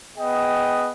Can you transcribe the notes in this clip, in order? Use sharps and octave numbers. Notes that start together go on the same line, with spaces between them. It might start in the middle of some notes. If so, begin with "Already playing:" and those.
B3 G#4 D#5 G5